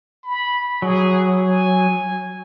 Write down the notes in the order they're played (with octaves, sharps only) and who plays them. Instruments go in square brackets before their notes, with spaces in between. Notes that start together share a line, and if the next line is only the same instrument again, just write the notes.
[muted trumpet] B5
[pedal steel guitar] F#3 [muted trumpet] G#4
[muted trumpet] G#5